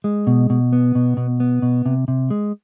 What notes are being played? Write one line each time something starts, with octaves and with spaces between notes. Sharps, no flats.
G#3
B2
B2
B3
B2
B2
B3
B2
C3
C3
G#3